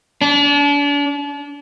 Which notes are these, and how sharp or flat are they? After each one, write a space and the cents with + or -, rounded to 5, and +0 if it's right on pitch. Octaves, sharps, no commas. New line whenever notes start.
D4 -40